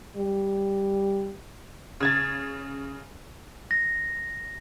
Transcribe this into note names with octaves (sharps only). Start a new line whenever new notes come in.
G3
C#3 G#6 A6
A#6